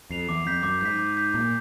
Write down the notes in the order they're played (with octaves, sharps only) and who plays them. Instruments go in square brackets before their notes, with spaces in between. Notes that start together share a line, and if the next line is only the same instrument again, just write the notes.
[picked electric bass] F2 [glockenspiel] C7 F7
[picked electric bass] E2 [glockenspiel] D6
[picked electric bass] F2 [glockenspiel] G6 B6
[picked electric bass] F#2 [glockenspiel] D6
[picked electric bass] G#2 [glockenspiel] G6 B6
[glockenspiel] D6
G6 B6
[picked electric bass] A#2 [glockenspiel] D6